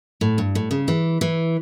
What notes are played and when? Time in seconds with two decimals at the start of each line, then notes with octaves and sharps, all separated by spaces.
0.21 A2
0.38 G2
0.55 A2
0.71 C#3
0.88 E3
1.21 E3